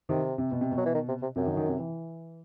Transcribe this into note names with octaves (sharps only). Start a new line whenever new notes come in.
C3 D#3
C3
B2
C3
B2
F#3
E3
D#3
C3
C3
F#2 C3
D#3
D#3
C3
E3